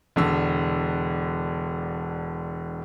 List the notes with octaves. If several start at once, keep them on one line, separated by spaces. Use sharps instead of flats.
E1 D3 E6